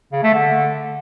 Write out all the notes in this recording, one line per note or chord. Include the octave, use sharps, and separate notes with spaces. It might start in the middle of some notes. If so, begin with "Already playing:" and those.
C#3
A3
D3